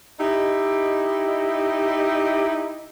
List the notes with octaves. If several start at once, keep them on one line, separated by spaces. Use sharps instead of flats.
D#4 E4 G4 D#5